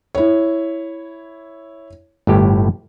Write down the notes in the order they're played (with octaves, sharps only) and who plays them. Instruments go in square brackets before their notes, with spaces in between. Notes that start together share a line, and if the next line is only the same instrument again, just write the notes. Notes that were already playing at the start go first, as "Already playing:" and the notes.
[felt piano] E4 C#5
[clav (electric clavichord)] G1 A2 G4